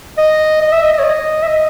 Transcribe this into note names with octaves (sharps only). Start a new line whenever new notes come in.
D#5
D#5
E5
D#5
D#5
C#5
D#5
E5
D#5